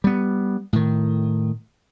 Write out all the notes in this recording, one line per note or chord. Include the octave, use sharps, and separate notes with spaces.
G3 B3
A2 D#3